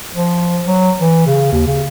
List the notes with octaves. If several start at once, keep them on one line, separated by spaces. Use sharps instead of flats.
F3
F#3
E3
C#3
D#2
C#3